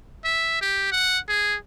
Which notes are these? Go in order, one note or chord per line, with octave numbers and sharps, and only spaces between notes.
E5
G4
F#5
G#4